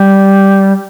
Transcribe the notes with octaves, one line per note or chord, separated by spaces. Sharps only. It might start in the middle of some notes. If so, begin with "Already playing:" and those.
Already playing: G3